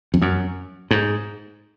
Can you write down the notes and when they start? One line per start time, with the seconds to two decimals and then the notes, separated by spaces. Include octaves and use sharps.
0.14 F2
0.22 F#2
0.91 G#2